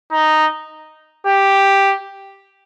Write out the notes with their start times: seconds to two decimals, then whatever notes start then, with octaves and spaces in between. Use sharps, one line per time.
0.12 D#4
1.27 G4